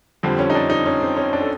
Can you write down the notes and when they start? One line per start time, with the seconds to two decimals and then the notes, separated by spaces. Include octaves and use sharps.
0.23 F2 D3 G3 C4
0.39 C#4
0.50 D#4
0.55 D4
0.70 D#4
0.86 C#4
1.01 C4
1.17 C#4
1.33 D4
1.41 A4